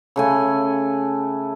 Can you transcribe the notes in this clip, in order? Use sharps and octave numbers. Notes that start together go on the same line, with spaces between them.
C#3 A3 G#5